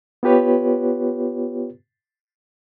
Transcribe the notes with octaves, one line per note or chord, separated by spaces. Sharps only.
B3 F4 G4 B4 C#5